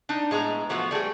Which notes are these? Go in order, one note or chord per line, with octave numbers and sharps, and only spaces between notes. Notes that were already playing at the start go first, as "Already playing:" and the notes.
D4 D#4
A2 G#3 B3 A#5
E3 F3 A3 B3 F#4
G3 A3 G#4 G5